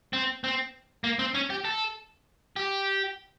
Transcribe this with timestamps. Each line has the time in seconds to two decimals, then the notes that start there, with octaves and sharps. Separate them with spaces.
0.13 C4
0.44 C4
1.04 A#3
1.19 C4
1.34 C#4
1.50 G4
1.65 A4
2.56 G4